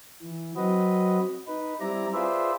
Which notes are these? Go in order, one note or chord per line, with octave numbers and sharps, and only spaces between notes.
E3
F#3 C4 F#4 B4 D#5
D#4 B4
G3 C4 E4 D5 A#5
F4 G#4 B4 C5 D5 E5